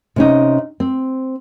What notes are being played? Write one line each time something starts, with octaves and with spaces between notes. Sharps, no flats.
C3 C#4 D#4
C4